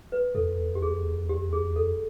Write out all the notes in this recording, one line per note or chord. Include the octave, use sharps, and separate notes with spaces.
B4
E2 A4
F2
E2
F2
G4
E2 G#4
F2
E2
F2
E2 G4
F2
E2 G#4
F2
E2
F2 A4